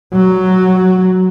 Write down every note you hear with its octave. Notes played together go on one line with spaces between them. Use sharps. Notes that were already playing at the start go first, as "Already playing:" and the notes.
F#3